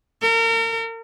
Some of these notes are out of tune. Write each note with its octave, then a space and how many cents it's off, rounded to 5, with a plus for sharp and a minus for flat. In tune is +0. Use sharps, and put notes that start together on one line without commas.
A#4 -35